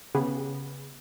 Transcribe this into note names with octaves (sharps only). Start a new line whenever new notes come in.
C#3 B3 G4 G#4 B4